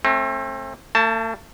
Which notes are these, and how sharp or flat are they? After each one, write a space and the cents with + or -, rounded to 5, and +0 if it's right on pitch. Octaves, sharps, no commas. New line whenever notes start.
A3 +0 C4 +35
A3 +45 A5 +0